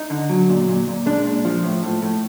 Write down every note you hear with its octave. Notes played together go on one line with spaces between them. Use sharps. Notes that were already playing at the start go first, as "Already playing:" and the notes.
Already playing: D#4
D3
F#3
A#2
A#2
A#2
G#3 D4
A#2
F3
A2
A2
A2